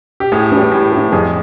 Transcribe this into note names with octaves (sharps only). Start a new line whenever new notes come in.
G4
A2 G#4
E3 G3
A2
E3 G3
F2 G#4